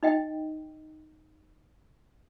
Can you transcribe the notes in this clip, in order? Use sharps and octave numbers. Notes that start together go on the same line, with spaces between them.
D#4 D#5 G5